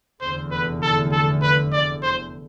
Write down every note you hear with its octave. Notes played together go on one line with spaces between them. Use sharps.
F1 E2 D3 C5
B4
A4
A4
B4
D5
C5